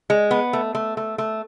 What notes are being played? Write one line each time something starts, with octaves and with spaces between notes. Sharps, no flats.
G#3
B3
A3
A3
A3
A3